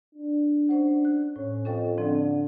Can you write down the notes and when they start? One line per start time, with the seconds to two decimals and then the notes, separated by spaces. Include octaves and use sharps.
0.15 D4
0.69 C#4 C5 F#5
1.05 F#6
1.36 A2 C#4
1.65 F2 C#4 A4 G5
1.98 D3 F3 C4